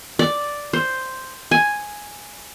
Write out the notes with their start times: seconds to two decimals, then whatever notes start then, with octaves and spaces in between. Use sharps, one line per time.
0.19 D5
0.73 C5
1.51 G#5